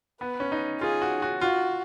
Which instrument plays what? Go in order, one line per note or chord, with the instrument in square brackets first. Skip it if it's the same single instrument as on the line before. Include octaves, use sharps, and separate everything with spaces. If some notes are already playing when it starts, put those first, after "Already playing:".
[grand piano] B3 [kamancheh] B4
[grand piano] C#4
D#4
[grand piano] F4 [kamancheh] G#4
[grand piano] F#4
F#4
[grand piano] F4 [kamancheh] F#4